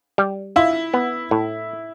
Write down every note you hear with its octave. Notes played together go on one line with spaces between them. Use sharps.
G3
E4 F4
B3
A2